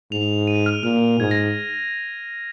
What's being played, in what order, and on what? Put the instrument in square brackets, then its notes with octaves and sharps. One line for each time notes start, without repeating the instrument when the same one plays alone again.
[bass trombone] G#2 [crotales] F7
[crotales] D#7
F6
[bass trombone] A#2 [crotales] F6
[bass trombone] G#2 [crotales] G#6
[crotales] A#6